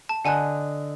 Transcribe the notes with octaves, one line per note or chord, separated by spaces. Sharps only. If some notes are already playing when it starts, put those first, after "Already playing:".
A5
D3 D#5 F#5 G#5 A5 F#6